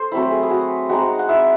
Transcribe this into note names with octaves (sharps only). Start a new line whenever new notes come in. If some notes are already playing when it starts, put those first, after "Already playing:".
Already playing: A4 C5
F#3 A3 C4 E4
G#4
G#4
F#4
G#3 C4 D#4 F#4
F#5
E4 E5